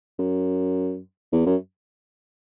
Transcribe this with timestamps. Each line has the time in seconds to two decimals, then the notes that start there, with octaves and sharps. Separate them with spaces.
0.19 F#2
1.32 E2
1.46 F#2